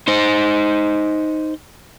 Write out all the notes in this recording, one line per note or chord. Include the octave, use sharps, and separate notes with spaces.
D#4 C5